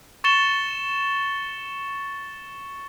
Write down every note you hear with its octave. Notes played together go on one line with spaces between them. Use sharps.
C#6 A6 C#7 E7 G7